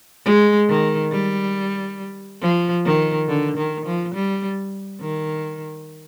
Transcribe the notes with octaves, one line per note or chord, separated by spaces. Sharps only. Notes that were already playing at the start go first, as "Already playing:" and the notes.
G#3
D#3
G3
F3
D#3
D3
D#3
F3
G3
D#3